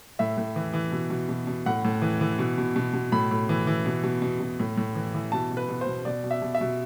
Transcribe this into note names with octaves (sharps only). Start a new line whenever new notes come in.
A2 E5
A2
E3
E3
B2
B2
B2
B2
A2 F#5
A2
E3
E3
B2
B2
B2
B2
A2 B5
A2
E3
E3
B2
B2
B2
B2
A2
A2
E3
E3
B2 A5
B2
B4
B2
C5
B2
B2 D5
B2
E5
B2
E5
B2